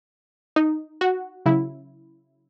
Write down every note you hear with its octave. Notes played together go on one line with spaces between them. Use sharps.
D#4
F#4
C#3 F#3 E4